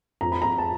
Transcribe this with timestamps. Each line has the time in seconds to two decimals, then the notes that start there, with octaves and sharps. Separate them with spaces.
0.21 F2 A#5
0.32 B5
0.42 A#5
0.45 F2
0.58 A5